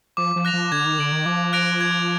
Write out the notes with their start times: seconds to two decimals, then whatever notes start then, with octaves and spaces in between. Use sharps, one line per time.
0.17 F3 D6
0.36 F3
0.45 F#6 A#6 F7
0.53 F3
0.72 D3 G#6
0.85 D#3
0.99 D3 D7 F#7
1.12 D#3
1.26 F3 D6
1.53 F#6 A#6 D7 F7
1.81 G#6